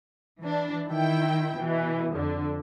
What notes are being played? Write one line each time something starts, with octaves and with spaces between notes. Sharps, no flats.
E3 D4
D#3 E4 G5
B2 E3
F2 D3